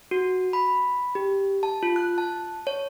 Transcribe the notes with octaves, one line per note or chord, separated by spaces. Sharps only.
F#4
B5
G4
A5
F4
F#6
A5
C#5